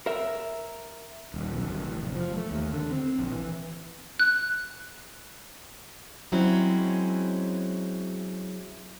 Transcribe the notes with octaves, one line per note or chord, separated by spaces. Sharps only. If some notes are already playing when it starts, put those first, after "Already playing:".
A#4 E5
D#1
B1
D1
A1
F1
F3
A3
D#2
D3
C4
A#1
E3
F#6
F#3 G#3 C4 C#4 E4